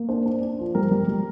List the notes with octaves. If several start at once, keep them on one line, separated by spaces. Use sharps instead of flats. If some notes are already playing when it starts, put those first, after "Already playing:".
Already playing: A#3
D4 C5
D4
D4
F3
G3 A#4
G3
G3